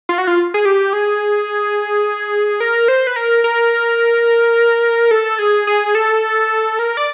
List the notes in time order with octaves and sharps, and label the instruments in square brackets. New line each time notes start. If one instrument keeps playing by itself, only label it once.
[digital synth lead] F4
F#4
F4
G#4
G4
G#4
A#4
C5
B4
A#4
A#4
A4
G#4
G#4
A4
A#4
D5